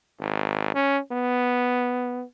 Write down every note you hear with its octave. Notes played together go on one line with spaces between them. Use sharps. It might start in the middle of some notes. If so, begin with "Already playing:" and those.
G#1
C#4
B3